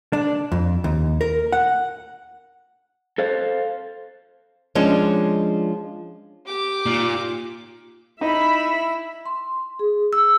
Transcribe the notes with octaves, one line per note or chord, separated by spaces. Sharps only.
D4
F2
D#2
A#4
F#5
A4 C5 F5
F3 G#3 C#4 D4
G4 D6
A#2 D#4 F4
D#4 E4 E5 B5
C6
G#4
E6